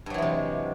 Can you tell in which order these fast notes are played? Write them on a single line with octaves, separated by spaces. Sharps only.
G2 F#3 E3 G#3 C3